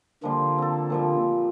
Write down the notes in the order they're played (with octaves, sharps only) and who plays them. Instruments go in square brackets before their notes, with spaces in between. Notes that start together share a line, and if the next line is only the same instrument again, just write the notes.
[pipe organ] D3 A#3 [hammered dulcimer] F3 G3 C6
[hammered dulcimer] C4 A4
A#2 F3 G3